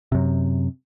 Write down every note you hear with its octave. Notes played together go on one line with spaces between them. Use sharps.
F#2 C3